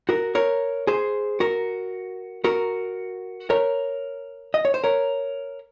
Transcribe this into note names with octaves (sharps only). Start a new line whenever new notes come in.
F#4 A#4
A#4 C#5
G#4 C5
F#4 A#4
F#4 A#4
A#4 C#5
D#5
C#5
C5
A#4 C#5